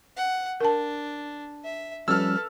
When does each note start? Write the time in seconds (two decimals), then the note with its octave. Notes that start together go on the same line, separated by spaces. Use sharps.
0.17 F#5
0.61 D4 A#4 A5
1.65 E5
2.08 F3 G3 C#4 A4 B4 E6 F6